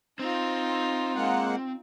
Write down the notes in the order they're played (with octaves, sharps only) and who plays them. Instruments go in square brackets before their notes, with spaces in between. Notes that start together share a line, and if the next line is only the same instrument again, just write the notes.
[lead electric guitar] C4 [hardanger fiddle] D#4 F4
[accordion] G#3 A#3 F#5